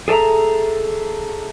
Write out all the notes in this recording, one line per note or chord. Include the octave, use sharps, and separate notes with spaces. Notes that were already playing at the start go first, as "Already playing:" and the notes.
G#4 A4 D5 E5 A#5